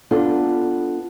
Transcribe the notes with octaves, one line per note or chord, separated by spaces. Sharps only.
B3 D4 F4 A4